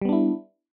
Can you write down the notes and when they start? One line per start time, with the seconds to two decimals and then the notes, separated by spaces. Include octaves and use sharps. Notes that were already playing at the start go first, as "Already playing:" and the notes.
0.02 G3
0.05 B3
0.09 D4
0.13 E4